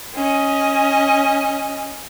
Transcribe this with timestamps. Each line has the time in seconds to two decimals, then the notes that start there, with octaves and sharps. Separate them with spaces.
0.15 C#4 D#5